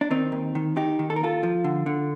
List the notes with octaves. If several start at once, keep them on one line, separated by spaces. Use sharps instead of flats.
D4
D#3 C4 D#4
D#2
D#3
D#3 D#4 G4
D#3
A4
A#4
D#2 F4 A4
F3
D3
D3